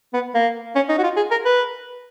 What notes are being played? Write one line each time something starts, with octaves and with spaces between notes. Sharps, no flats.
B3
A#3
C#4
D#4
F#4
F4
G#4
A#4
B4